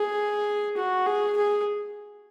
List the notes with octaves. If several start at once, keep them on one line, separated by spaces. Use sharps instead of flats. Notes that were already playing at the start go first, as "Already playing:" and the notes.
Already playing: G#4
F#4
G#4
G#4